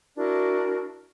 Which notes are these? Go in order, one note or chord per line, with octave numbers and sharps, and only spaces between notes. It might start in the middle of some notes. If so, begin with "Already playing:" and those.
D4 E4 F#4 A#4